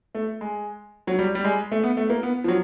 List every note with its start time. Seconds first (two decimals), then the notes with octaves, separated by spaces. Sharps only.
0.15 A3
0.41 G#3
1.07 F#3
1.19 G3
1.35 G3
1.45 G#3
1.72 A3
1.83 B3
1.97 A3
2.10 A#3
2.23 B3
2.44 F3
2.48 F#3